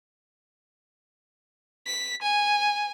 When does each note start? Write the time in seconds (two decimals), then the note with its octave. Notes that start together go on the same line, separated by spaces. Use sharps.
1.87 B6
2.22 G#5